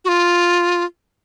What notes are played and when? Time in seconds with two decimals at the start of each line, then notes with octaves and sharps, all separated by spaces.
0.05 F#4
0.08 F4